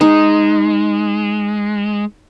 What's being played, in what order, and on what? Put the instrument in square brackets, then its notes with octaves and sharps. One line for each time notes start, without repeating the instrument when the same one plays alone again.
[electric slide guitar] G#3 [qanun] D#4